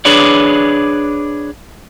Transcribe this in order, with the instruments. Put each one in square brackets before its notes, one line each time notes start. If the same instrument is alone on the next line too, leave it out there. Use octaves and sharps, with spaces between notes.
[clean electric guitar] D4 G#4 B4 C#5 D5